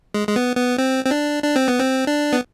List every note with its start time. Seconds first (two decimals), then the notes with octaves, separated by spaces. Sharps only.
0.14 G#3
0.28 G#3
0.36 B3
0.56 B3
0.78 C4
1.05 C4
1.11 D4
1.43 D4
1.56 C4
1.68 B3
1.79 C4
2.07 D4
2.33 B3